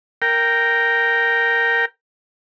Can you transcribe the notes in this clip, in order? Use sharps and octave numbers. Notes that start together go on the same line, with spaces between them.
A#4 G5